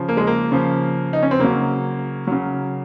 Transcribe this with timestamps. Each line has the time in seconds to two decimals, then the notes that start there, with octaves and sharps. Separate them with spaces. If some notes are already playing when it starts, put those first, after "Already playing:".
Already playing: C#3 F3
0.08 A#3
0.17 G#3
0.27 A#3
0.52 C#3 F3
1.13 D#4
1.22 C#4
1.31 C4
1.39 C#3 F#3 A#3
2.27 C#3 F#3